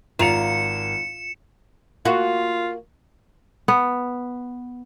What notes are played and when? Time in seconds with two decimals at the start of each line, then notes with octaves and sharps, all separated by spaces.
0.19 G#1 F4 A#5 C#7 E7 F7
2.05 A#3 F4 F#4
3.68 B3